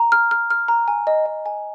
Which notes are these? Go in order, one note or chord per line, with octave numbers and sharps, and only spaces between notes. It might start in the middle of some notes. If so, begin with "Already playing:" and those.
Already playing: A#5
F6
F6
F6
A#5
G#5
D#5
D#5
G#5